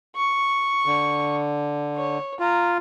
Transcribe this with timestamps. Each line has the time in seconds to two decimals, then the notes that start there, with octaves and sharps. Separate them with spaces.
0.16 C#6
0.86 D3
1.96 C#5
2.39 F4 A#5